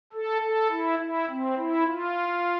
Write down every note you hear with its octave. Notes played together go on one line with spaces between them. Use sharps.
A4
A4
E4
E4
C4
E4
F4